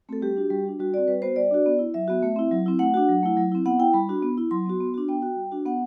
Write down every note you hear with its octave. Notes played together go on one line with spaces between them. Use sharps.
A3 C4 F#4 A4
G3 G4
D4 F#4
G3
D4 F#4
G3 F#4
C4 F#4 D5
G3 B4
B3 F#4 C5
G3 D5
D4 F#4
B3
E4
F#3 E5
B3 F#4
A3
C4 E4
F#3
C4 E4
A3 F#5
D4 F#4
F#3
A3 E4
F#3
C4 E4
B3 F#5
E4 G5
G3 B5
D4 F#4
B3
E4
F#3 C6
B3 F#4
B3
D4 F#4
B3 G5
F#4
G3
D4 F#4
B3 F#5